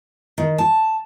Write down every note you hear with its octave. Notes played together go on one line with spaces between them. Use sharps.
D#3
A5